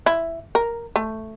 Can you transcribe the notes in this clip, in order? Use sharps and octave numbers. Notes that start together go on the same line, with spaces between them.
E4
A#4
A3